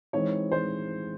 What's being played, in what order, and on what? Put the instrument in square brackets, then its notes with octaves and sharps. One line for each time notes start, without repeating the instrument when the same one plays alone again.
[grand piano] E3 G#3 C4 D#4 [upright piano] C#5
[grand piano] E3 G#3 [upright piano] C5